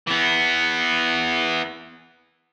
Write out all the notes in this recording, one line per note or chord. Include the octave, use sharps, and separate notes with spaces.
E3 B3